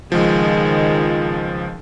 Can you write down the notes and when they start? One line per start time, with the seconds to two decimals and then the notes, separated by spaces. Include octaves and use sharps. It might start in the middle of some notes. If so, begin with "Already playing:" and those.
0.12 C#2 D#3 F3 G#3